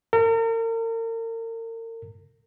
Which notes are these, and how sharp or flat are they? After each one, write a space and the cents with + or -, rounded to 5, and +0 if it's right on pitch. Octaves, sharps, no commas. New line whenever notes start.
A#4 -40